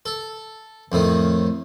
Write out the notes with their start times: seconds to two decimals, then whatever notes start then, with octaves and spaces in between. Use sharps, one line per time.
0.06 A4
0.92 F2 A2 D#3